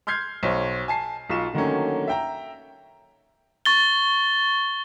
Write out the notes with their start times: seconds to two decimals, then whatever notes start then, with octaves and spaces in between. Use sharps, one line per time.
0.07 C6 F6 G6 G#6 C7
0.43 B1 C5 C#5
0.88 G#5 A5 C7
1.30 B1 F4 C#6 E7
1.54 D3 D#3 F#3 A3 A#3 C#4
2.08 E5 G5 A#5
3.65 C#6 A6 G7